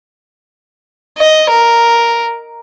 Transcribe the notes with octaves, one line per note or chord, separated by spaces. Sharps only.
D#5
A#4